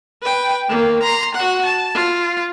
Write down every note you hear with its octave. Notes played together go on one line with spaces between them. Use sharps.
B4 G5
D#3 A#3
A#5 C6
F#4 F#5
A5
F4